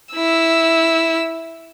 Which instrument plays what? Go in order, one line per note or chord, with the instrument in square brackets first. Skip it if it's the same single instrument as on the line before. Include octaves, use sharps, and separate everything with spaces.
[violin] E4 E6